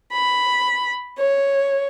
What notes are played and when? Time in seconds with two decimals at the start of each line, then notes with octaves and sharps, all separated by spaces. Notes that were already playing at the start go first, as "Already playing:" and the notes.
0.12 B5
1.18 C#5